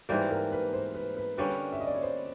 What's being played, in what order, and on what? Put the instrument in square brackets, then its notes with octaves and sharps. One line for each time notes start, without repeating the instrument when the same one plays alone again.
[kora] G#2 E3 G3 A#3 [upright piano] B4
[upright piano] A#4
B4
C5
B4
B4
[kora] D3 G3 A#3 C#4 [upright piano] B4
[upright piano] E5
D#5
D5
C#5
C5